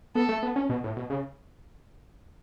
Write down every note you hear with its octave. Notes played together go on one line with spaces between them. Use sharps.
B3 A4
A3
B3
C#4
B2
A2
B2
C#3